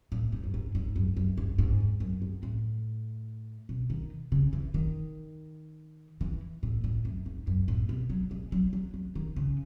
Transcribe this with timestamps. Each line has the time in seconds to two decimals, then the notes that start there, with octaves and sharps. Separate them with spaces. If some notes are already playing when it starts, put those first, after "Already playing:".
0.12 A2
0.32 G#2
0.44 F#2
0.54 G#2
0.75 G#2
0.96 F#2
1.17 F#2
1.38 G#2
1.58 G#2
1.80 E2
2.00 F#2
2.22 G#2
2.43 A2
3.69 B2
3.90 D#3
4.32 C#3
4.53 E3
4.74 D#3
6.21 E3
6.63 A2
6.84 A2
7.05 F#2
7.26 G#2
7.47 F#2
7.68 A2
7.89 B2
8.10 F#3
8.31 G#3
8.52 F#3
8.73 F#3
8.94 F#3
9.15 D#3
9.36 C#3